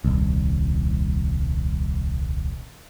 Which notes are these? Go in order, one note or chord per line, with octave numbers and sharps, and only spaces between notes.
D#1 C2